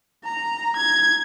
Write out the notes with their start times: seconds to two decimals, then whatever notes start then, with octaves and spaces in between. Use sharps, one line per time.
0.24 A#5
0.76 G#6